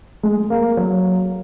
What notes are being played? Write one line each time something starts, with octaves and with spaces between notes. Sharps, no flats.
G#3
A#3
F#3